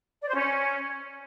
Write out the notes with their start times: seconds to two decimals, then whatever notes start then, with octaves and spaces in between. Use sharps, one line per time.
0.22 D5
0.29 C5
0.35 C#4